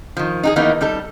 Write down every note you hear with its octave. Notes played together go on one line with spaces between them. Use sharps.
D#3 F3
D#4 F#4 G#4
D#3 E3 A#3 B3 D#4
G3 D#4 A4